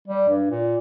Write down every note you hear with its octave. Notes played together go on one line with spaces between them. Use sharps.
G3
G2
A#2